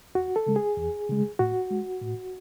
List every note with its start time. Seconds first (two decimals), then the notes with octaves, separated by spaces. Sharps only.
0.15 E2 F#4
0.36 A4
0.46 C#3 G#3
0.56 G#4
0.77 E2
1.09 C#3 G#3
1.39 A2 F#4
1.70 G#3
2.02 A2